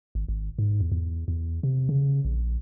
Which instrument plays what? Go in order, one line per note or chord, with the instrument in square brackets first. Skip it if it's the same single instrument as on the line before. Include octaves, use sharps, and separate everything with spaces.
[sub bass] G#1
G#1
G#2
E2
E2
E2
C3
C#3
A#1